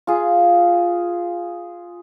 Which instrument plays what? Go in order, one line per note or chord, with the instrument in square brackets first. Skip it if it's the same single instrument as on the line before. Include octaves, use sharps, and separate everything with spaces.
[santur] F4 G#4